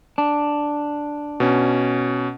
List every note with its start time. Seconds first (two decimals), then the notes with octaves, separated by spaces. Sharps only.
0.18 D4
1.40 B2 C#4